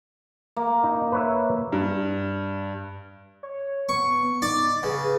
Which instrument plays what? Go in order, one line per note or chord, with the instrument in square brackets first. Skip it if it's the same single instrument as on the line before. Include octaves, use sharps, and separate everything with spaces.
[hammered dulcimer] A#3
[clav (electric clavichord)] D#4
B4 C#5 E5
[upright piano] G2
[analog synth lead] C#5
[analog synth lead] B3 [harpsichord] C#6
[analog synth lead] D#4 [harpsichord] D5
[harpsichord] C#3 [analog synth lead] B4